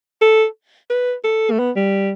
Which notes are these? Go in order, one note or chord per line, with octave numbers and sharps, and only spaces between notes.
A4
B4
A4
A3
B3
G3